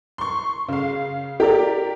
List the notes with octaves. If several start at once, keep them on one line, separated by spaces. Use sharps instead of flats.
C6 C#6
C#3 F5
G4 A#4 D5